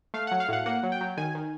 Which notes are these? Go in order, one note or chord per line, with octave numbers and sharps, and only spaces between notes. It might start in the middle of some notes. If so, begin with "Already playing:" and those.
A3 F5
F#5
F#3
F5
A2 F#5
A#3 F#5
F#3
G5
F#3
D#3 G#5
D#3